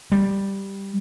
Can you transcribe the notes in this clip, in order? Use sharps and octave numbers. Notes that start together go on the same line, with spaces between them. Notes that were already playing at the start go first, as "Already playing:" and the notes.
G3